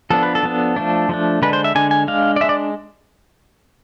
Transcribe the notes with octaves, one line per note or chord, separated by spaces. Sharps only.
F3 B3 D4 A4
B4
A4
F3 B3 D4
F3 A3 D4
F3 A3 D4
D3 G#3 D4 B4
C5
E5
D3 G#3 D4 G#5
G#5
G#3 D4 F5
D5
G#3 D4 E5
D5